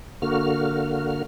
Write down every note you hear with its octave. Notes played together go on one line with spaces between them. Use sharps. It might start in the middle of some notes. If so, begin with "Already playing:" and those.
D3 A#3 F#4 F6